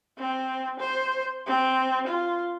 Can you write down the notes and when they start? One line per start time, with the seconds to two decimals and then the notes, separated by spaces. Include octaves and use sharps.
0.18 C4
0.80 C5
1.47 C4
2.08 F4